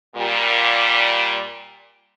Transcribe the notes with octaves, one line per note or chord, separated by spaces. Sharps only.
A#2 G3